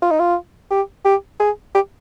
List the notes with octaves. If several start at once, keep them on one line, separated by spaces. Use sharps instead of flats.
F4
D#4
F4
G4
G4
G#4
G4